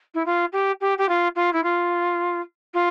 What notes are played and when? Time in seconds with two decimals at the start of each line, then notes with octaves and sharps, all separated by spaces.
0.14 E4
0.26 F4
0.52 G4
0.81 G4
0.98 G4
1.09 F4
1.36 F4
1.53 E4
1.63 F4
2.74 F4